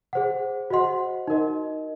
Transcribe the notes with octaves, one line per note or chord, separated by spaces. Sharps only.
G#4 C5 F#5
F#4 C5 D#5 F#5 C6
D#4 A#4 D#5